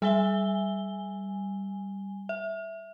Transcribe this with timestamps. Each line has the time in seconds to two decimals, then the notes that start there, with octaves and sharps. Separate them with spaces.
0.02 G3 E5 G#5 G7
2.29 E5